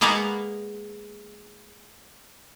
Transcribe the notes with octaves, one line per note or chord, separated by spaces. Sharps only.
G#3 A#3 B3 A#4 F5 F#5